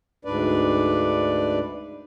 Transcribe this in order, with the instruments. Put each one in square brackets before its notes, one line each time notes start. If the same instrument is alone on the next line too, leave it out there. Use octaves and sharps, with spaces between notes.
[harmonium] D2 G#2 D4 B4 D5